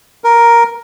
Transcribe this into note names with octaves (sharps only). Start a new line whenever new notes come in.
A#4